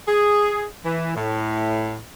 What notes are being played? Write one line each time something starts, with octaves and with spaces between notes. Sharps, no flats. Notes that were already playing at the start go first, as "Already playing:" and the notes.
G#4
E3
A2